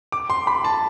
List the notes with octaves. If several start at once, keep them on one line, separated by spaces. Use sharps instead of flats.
D6
C6
B5
A5